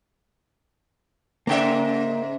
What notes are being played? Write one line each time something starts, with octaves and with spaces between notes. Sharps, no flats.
G#2 C#3 A#3 E5 G5